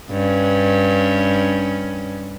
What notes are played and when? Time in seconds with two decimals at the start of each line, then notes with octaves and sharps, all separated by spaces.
0.10 G2 C#4